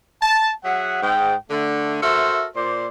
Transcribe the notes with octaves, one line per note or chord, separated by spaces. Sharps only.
A5
F#3 G#4 E5 F#5
G#2 G5
D3 A3
F#4 A4 A#4 C5 E5
A#2 C5 D5